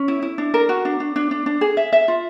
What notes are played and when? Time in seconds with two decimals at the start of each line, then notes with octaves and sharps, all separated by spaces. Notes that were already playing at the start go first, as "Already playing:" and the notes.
Already playing: C#4
0.08 E4
0.22 E4
0.38 D4
0.54 A#4
0.69 F#4
0.85 D4
1.00 D4
1.16 D4
1.31 D4
1.46 D4
1.61 G#4
1.77 E5
1.93 E5
2.08 F4